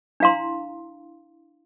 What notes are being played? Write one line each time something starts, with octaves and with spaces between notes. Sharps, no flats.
D4 E4 F5 A#5 C6